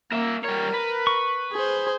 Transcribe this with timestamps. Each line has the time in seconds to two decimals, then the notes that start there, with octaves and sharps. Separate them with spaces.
0.12 A#3 A#4 E5
0.45 G3 A#4 C#5
0.74 B4
1.07 C#6
1.53 G#4 C5